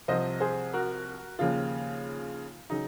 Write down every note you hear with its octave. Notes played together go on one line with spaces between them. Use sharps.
C2 C3 F3 C5 D#5
G#4 C5
F#4 A#4
D#2 C#3 F3 F4
C#3 F#3 D#4